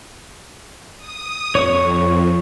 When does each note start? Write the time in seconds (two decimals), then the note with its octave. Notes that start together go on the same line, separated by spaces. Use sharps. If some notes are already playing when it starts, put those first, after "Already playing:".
0.98 D#6
1.55 F2 C#5 C#6